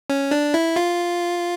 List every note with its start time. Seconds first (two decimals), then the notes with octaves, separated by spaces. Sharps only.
0.10 C#4
0.31 D4
0.54 E4
0.76 F4